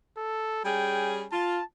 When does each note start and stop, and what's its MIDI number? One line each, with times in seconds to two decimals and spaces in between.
0.18 0.64 69
0.65 1.25 55
0.65 1.25 61
0.65 1.25 68
0.65 1.12 79
1.32 1.59 65
1.32 1.65 81